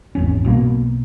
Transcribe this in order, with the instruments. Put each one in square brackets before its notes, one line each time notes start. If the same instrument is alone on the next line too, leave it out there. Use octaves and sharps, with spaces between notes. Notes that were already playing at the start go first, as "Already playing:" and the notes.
[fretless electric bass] G#1 E2 C#4
B1 B2 A#3